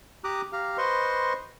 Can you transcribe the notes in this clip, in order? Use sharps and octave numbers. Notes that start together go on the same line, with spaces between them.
G4 A#5 D6 D#6 F#6
G4 F5 A#5 F6
B4 C5 D#5 C6 C#6